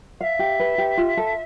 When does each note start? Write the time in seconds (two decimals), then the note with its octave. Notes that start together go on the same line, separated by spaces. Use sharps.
0.20 E5 F5
0.39 G4
0.60 B4
0.78 G4
0.97 F4
1.17 A4